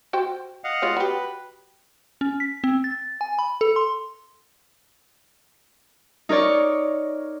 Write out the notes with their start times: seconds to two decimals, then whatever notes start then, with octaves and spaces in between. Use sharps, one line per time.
0.13 F#4 C5 G5
0.64 D#5 F5 F#5
0.82 G#3 F4 C#5
0.97 F#4 G4 B4
2.21 C#4
2.40 B6
2.64 C4
2.84 A6
3.21 G#5
3.39 B5
3.61 A4
3.76 C6
6.29 D#4 A#4 C#5 D5 C#6